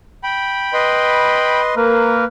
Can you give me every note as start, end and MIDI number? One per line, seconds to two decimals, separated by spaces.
0.24 1.61 79
0.24 1.61 83
0.73 1.75 71
0.73 1.75 75
0.73 1.75 84
1.76 2.25 58
1.76 2.25 70
1.76 2.25 71